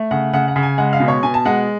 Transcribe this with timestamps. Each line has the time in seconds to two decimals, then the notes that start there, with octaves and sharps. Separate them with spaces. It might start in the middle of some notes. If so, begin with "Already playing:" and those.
Already playing: A3
0.11 C#3 F#5
0.33 C#3 F#5
0.48 F#5
0.56 C#3
0.63 G#5
0.78 G#3 F#5
0.93 F5
1.00 B2
1.08 C#5
1.23 B2 G#5
1.34 A5
1.45 G#3 F#5